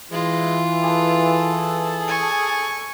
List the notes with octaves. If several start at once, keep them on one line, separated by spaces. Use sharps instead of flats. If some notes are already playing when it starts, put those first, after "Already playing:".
E3 G#3 F4
G#4 A4 A5
G#5 C#6